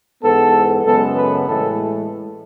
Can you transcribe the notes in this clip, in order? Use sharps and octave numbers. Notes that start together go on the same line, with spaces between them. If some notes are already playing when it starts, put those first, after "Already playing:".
G#2 E3 B3 A4
F#2 C#3 G#3 B3 A4
B4
A2 E3 G#3 A4